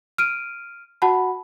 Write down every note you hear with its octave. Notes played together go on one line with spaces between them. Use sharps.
F6 D7 D#7
F#4 F#5 A5 B5